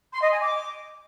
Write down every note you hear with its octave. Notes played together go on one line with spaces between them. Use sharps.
C6
D#5
G#5
D6